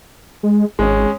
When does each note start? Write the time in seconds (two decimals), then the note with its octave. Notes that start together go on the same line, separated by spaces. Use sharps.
0.43 G#3
0.79 G#1 G#3 C#4